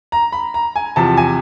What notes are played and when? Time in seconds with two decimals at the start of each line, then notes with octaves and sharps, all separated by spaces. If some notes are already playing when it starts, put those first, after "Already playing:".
0.12 A#5
0.32 B5
0.54 A#5
0.76 G#5
0.96 E2 C3 F3 A5
1.17 G#5